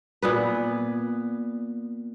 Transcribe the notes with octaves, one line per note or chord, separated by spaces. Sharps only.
A#2 B3 B4